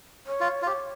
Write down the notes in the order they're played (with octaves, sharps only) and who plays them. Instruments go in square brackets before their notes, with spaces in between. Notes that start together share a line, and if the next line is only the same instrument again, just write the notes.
[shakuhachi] C#5
[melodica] F4
F4
[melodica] G4 [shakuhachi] C#5